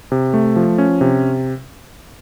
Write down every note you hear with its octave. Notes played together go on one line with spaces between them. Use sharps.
C3
A3
F3
C#4
C3